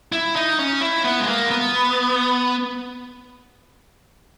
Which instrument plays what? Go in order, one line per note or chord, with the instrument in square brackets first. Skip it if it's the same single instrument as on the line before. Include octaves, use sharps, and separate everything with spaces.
[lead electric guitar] E4
D#4
C#4
E4
B3
G#3
A#3
B3